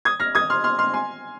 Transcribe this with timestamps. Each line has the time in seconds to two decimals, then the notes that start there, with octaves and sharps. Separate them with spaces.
0.05 D#6 G#6
0.20 F6 A#6
0.35 D#6 G#6
0.50 C6 F6
0.64 C6 F6
0.79 C6 F6
0.94 G#5 C6